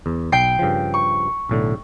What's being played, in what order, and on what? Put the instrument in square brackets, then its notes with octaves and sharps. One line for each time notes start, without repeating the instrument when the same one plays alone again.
[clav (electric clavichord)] E2
[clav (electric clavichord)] B1 [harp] G5 C7
[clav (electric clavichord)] G2 C#3 F3
[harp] C#6
[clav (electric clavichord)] B1 A2 D3